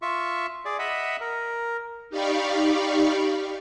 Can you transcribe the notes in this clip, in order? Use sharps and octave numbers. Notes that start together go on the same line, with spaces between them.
F4 E5 C#6
G#4 D5
D#5 E5 F#5 B5
A#4
D#4 G4 D5 F5 B5 C#6